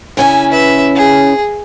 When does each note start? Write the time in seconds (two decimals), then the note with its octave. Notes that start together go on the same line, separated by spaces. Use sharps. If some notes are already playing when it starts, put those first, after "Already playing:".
0.17 C#3 C#4 E4 G#5
0.51 B4 E5
0.95 G#4